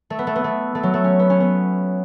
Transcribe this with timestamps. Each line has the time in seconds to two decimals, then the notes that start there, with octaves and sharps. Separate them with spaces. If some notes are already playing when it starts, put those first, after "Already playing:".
0.10 A3
0.19 B3
0.27 A3
0.36 B3
0.44 A3
0.75 A3
0.83 F#3
0.94 A3
1.04 C#4
1.19 B3
1.30 C#4
1.40 B3